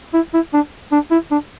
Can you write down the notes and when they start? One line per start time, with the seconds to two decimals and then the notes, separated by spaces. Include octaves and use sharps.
0.14 E4
0.34 E4
0.53 D4
0.92 D4
1.11 E4
1.31 D4